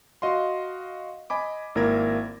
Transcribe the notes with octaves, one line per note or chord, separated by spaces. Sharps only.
F#4 D#5 F5 C6
D#5 G#5 B5 D6
G#1 A#3 E4 A#4 G#6 A#6